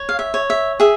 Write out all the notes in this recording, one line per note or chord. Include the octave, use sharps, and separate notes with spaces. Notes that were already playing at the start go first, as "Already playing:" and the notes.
Already playing: C#5
F5
E5
C#5
E5
G#4 E5